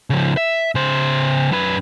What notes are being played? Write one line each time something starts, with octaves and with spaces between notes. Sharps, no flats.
C#3 F3
E5
C#3 C5
F#2 B4